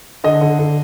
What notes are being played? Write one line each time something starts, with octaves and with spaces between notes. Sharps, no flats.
D3 D#5
D3
D3